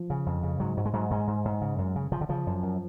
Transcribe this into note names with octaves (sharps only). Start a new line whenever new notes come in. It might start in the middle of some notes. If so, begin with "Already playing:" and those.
Already playing: F3
C#3
F2
C#3
G#2 F#3
G#2 F#3
G#3
G#2 F#3
G#2 G#3
G#2
G#2
C#3
F#2
C#3
C#3 F3
D3
C#3 F3
F#2
F#2